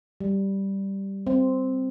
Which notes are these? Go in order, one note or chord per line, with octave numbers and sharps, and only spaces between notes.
G3
C4